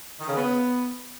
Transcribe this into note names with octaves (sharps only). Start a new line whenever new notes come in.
D#3
C#3
B3